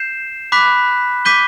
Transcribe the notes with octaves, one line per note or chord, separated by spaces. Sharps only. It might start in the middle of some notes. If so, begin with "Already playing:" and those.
Already playing: G6 C7 E7
B5 D6 F#6 B6
D6 G6 B6 D#7 G7